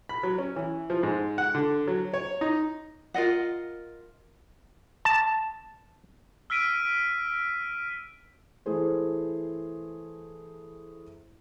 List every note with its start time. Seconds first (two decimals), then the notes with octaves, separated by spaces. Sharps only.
0.09 B5
0.23 F#3
0.38 C#4
0.56 E3
0.90 F3
1.03 G#2
1.38 F#5
1.55 D3
1.88 F#3
2.14 C#5
2.41 D#4
3.14 F4 A#4 D#5 F#5
5.05 A5
6.50 E6 F6 B6 D7 D#7
8.66 E3 A3 E4 G#4 C5